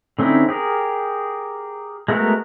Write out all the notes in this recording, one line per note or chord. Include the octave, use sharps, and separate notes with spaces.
D3 C4 C#4 D#4 E4
G4 G#4 A#4
G#3 A3 B3 F#4 A#4